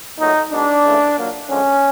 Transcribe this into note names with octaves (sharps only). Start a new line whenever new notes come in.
A#2 F#3 A3 D#4
B2 G#3 D4
C#3 E3 A3
A#2 F#3 A#3
D3 F3 G#3 C#4